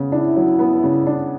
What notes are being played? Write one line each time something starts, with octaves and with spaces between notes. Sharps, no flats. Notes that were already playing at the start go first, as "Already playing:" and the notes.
Already playing: C#3 B3
D4 E4
F#3
B3
C#3
D4